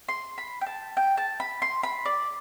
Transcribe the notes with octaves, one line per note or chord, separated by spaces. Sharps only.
C6
B5
G5
A5
G5
A5
B5
C6
B5
D5